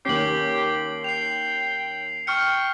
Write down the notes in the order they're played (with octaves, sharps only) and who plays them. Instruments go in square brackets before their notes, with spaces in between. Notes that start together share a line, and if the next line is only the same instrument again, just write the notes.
[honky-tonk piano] D#2 C#4 [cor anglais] G4 [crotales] C7 F#7
[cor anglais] G5 [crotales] C7 F7
[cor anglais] G5 [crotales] C#6 F6 C#7